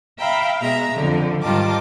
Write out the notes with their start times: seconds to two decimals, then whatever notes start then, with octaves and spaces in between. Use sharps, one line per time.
0.19 E5 F5 G5 A#5 B5
0.60 B2 G#3 E5 A#5
0.94 F2 D3
1.43 G#2 D#3 G3 F4 A5 D6